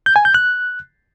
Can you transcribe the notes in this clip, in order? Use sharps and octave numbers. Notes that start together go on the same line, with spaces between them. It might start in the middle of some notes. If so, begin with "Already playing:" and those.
G6
G#5
G6
F#6